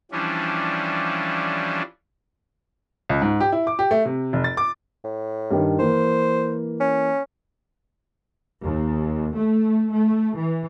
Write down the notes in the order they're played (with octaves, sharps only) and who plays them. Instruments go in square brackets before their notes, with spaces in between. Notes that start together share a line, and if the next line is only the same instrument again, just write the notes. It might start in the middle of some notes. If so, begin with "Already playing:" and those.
[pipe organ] E3 F3 G3 C#4 D4
[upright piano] C#2
G#2
G4
E4
D6
G4
A3
C3
F1
A6
D6
[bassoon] A2
[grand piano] G2 D#3
[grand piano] E3 A#3 [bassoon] C5
[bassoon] C#4
[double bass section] D#2
A3
A3
E3